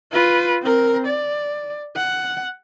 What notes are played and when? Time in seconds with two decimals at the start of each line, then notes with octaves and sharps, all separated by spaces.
0.12 F4 B4
0.62 C4 A#4
1.07 D5
1.96 F#5